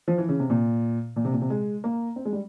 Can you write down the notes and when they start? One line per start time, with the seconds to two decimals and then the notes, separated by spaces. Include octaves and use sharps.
0.08 F3
0.18 E3
0.29 C#3
0.39 C3
0.50 A#2
1.16 A#2
1.25 C3
1.33 A#2
1.42 C3
1.50 G#3
1.84 A#3
2.16 C4
2.25 G#3
2.33 G3